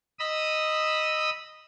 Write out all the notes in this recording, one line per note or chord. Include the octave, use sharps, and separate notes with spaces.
D#5 B5 D#6 E6